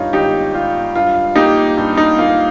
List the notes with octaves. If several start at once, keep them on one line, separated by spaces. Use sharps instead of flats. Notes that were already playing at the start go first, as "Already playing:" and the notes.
Already playing: G2 D#4 F4 C#5
G#1 D#4 G4
G3 F4
G2 F4
A#3 D#4 G4
G2
D#4
A#3 F4